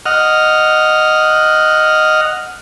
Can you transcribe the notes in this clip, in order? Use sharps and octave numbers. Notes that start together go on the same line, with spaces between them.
D#5 F#5 F6